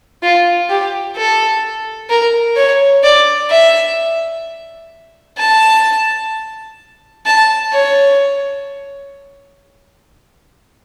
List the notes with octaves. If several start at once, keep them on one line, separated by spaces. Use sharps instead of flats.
F4
G4
A4
A#4
C#5
D5
E5
A5
A5
C#5